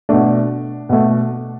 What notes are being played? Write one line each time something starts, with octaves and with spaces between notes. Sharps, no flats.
B2 A3 D4
B2 A3